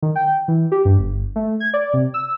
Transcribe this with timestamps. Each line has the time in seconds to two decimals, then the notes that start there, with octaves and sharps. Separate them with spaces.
0.02 D#3
0.16 G5
0.48 E3
0.72 G4
0.85 G2
0.98 G1
1.36 A3
1.60 G#6
1.74 D5
1.93 C3
2.14 E6